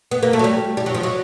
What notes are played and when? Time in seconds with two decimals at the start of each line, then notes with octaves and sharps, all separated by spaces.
0.11 B3
0.23 A#3
0.33 A3
0.39 F#3
0.44 G3
0.77 G3
0.86 F#3
0.95 F3
1.03 F#3